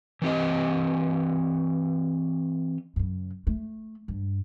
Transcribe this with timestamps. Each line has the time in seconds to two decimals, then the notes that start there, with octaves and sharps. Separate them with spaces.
0.22 E3 C4 G4 D#5
2.96 F#2 C#3
3.47 A3
4.08 G2